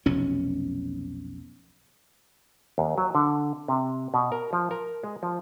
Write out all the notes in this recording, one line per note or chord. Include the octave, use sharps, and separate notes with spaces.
F1 B1 F#3 C#4
D#2
F#3
D3
C3
B2
A#4
F3
A#4
G#3
F3